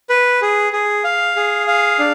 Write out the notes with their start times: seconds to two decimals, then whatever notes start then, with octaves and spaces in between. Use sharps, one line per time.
0.09 B4
0.42 G#4
0.73 G#4
1.04 F5
1.36 G#4
1.68 F5
1.99 D4